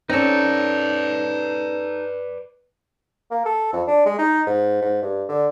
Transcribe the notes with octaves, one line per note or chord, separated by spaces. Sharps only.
C4 C#4 D#4 A4 B4 D5
A#3
A4
F2
D4
G#3
D#4
G#2
G#2
G2
D3